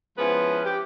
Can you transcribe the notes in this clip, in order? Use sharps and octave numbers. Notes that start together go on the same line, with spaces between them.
F3 G#3 B3 C#4 E4 B4
G4